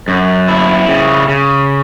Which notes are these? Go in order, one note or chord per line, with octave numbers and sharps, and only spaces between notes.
F#2
E4
C#3
C#3